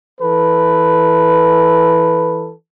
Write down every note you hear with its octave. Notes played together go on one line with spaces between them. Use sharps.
E3 A4 B4